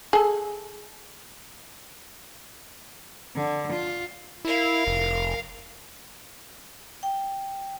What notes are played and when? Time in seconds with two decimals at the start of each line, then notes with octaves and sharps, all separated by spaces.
0.13 G#4 A4
3.36 D3
3.73 F4
4.45 E4 A#4 F5
4.87 F1
7.03 G5